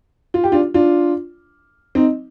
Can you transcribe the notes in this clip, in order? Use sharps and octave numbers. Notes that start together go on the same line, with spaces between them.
F4
G4
D4 F4
D4 F4
C4 D#4